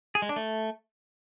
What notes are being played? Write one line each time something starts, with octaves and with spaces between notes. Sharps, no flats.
G#4
G#3
D4
A3